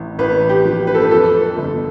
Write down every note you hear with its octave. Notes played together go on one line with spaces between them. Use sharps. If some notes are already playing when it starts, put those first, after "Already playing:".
Already playing: A1 A2
A1 B4
G4
F3
B4
A4
B4
F2 A4
A4
G1